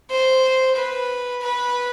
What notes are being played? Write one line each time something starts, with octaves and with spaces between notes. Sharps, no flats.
C5
B4
B4